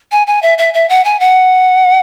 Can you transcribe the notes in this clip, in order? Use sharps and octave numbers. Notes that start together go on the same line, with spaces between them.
G#5
G#5
E5
E5
E5
F#5
G#5
F#5